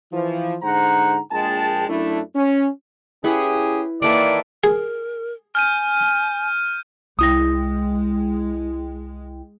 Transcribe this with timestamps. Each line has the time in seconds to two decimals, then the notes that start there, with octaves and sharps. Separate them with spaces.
0.12 E3 F3
0.63 G#2 D3 C5 F#5 A#5
1.32 A#1 G#3 G5 A5
1.89 F#2 A3 D4 E4
2.35 C#4
3.24 C#4 E4 G4 G#4 B4 F#5
4.02 D#3 E3 A#3 A4 D5 A5
4.64 G#4 A#4
5.55 G#5 F6 G6 D#7
7.19 C2 G#3 E4 G5 D#6 A#6